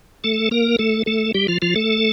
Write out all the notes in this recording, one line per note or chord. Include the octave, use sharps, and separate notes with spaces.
A3 A4
A#3 A#4
A3 A4
A3 A4
G3 G4
F3 F4
F3 F4
A3 A4